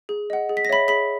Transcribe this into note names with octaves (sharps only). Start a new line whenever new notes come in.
G#4
D#5 F#5
G#4
B6
A#6
C#5 E5 B5 B6
G#4 B5 B6